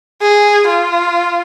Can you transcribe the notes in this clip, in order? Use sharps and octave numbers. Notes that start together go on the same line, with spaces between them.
G#4
F4